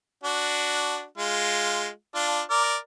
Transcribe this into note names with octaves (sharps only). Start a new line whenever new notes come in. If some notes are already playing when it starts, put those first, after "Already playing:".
D4 F#4
G#3 F4
D4 F4
A#4 D5